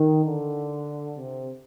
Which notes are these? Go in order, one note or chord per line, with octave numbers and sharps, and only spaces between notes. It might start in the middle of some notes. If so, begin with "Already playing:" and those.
Already playing: D#3
D3
C3